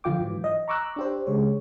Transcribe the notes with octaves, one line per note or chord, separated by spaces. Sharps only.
D3 F3 F4 G5 D6
G#2 E3 F#3
D#5
A#5 C#6 D6 E6 F#6
D4 G4 C5
C#3 G#3 C#5